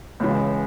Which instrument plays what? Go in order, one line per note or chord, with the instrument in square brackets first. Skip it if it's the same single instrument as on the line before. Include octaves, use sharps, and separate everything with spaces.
[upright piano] C#2 C#3 E3 G#3